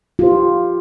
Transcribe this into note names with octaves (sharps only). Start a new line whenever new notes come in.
F4 G4 C5